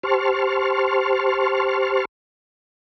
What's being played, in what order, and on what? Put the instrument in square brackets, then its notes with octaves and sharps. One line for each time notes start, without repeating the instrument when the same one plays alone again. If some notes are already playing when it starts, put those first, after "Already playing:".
[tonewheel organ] G4 C5 A5 C6 C#6 F6